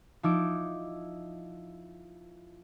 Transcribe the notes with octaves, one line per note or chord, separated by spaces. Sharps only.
F3 D#4 E4 D6